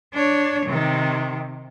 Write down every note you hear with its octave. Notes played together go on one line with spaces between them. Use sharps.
D4 C#5
C3 D#3